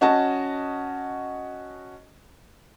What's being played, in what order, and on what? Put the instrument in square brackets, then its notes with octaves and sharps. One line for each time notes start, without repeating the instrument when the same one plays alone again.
[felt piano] C#4 F#4 D#5 A5